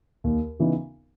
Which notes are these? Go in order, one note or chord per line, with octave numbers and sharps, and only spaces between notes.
D#2
C#3 E3 B3 D#4